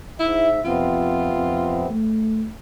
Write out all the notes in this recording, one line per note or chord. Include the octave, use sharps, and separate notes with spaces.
G#2 E4 E5
F2 C3 B3 C4 F4
F2
A3